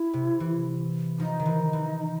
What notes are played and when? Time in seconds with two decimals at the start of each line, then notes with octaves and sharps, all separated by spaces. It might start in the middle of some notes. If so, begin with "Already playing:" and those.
Already playing: E4
0.13 C3
0.40 E3
1.19 F3 D#4
1.40 D#3
1.46 E3
1.73 E3